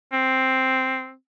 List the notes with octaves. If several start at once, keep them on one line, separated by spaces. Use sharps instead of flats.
C4